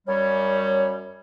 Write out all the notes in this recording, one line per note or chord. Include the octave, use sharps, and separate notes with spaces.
F#2 G3 C#5